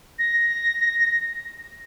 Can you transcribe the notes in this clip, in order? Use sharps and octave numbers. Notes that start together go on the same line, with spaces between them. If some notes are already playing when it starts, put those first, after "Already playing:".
A#6